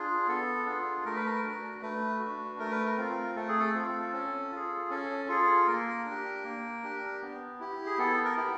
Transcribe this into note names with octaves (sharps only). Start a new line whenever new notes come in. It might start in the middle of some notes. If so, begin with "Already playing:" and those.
Already playing: D4 F4 G#4
B3 A4
D4 F4 G#4
A3 A#4
B4
A#4
D4 F#4
A3 B4
F#4
D4
A3 A#4
B4
A#4
C4 F4
A3 A4
G#4
A4
C4 F4
C#4
F4 G#4
C#4 A4
F4 G#4 A4
A#3 A#4
D4
G4
A#3
D4 G4
B3
E4 G4
G#4
B3 A4
A#4
E4 G4